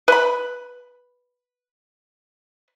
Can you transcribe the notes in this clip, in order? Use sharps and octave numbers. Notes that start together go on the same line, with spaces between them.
B4 B5